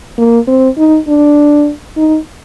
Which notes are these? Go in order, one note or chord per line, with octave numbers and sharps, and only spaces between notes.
A#3
C4
D#4
D4
D#4